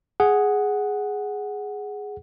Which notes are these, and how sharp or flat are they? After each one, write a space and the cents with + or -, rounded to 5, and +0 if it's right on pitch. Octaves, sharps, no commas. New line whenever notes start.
G#4 +0 F#5 +0